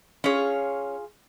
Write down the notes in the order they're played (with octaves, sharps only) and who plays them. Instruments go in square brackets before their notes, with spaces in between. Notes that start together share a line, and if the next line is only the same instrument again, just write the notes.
[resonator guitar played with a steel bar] C#4 C#5 [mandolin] F4 G#4